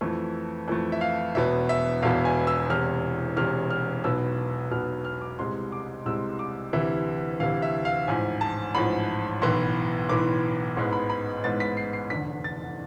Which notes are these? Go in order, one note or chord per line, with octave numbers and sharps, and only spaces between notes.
F2 E3 A3
F2 E3 A3
E5
F5
E1 E2 B2 B3 E5
E5
E1 E2 B2 B3 F5
G#5
E6
E1 E2 C3 F6
E1 E2 C3 F6
F6
B1 B2 B3 E6
B1 B2 B3 F6
F6
D6
C2 C3 G#3 C6
D6
C2 C3 G#3 E6
D6
D2 C3 E3 E5
D2 C3 E3 F5
E5
F5
A1 G#2 F3 G#5
A5
A1 G#2 F3 B5
B1 A2 E3 B3 C6
B1 A2 E3 B3 D6
A1 G#2 G#3 B3 C6
B5
B5
A1 G#2 G#3 B3 A6
B6
C7
C7
F1 E2 D3 B6
A6